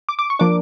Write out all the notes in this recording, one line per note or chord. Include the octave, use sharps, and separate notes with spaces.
D6
D6
C#6
F3 A#3 D4 D6